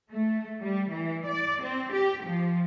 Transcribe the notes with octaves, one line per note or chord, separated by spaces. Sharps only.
A3
G3
E3
D5
C4
G4
F3